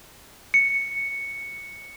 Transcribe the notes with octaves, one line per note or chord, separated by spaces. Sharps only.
C#7